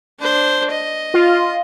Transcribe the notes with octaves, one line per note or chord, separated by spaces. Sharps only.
D4 C5
D#5
F4